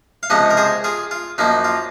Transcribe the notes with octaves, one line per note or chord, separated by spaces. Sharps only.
F5
C#2 C3 F3 D#5 F#5
A#4
G#4 C5
F4 G#4
F4
F#2 F3 A#3 D#4
F4